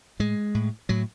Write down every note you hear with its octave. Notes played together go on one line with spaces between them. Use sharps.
A2 G#3
A2
A2 F#3